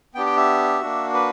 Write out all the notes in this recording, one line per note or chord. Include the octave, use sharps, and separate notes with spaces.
B3 D4 G4 G5
G5
E5
A#3 D4 F#4
B4